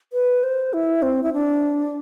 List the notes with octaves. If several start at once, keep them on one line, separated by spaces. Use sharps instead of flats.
B4
C5
E4
C4
E4
D4